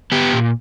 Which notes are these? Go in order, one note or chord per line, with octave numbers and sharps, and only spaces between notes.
B3 G4
A#2